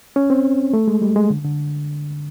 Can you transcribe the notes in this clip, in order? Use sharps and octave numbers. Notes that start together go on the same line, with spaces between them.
C#4
C4
A3
G#3
G3
G#3
D3
D3